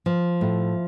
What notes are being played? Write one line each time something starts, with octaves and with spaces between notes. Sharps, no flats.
F3
A2